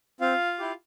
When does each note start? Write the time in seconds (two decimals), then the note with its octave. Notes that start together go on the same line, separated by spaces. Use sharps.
0.20 C4 F4 F5
0.59 E4 G4